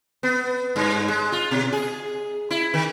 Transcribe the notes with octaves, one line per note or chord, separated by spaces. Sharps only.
B3
G2
G#3
F4
B2
G#4
E4
D#3